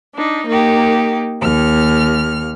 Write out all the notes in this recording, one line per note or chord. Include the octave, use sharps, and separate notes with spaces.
D4 D#4
A#3 D#4 G4
D#2 F6